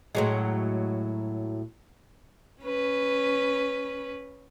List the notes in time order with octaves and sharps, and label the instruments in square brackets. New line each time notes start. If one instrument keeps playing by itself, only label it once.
[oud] A2 F#3 G#3
[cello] C#4 B4